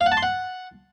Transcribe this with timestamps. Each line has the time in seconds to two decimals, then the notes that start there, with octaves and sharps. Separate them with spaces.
0.01 F5
0.06 F#5
0.12 A5
0.17 C6
0.23 F#5